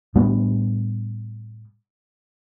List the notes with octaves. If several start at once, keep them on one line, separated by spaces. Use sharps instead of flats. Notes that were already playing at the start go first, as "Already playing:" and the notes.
A2 G3 B3 D4